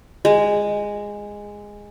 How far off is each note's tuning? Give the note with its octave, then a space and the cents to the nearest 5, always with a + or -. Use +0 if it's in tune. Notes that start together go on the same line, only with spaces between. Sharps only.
G#3 -10